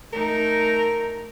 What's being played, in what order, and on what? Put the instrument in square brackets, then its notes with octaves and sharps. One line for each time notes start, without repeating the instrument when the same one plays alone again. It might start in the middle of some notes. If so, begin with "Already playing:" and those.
[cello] A3 D#4 [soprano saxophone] A#4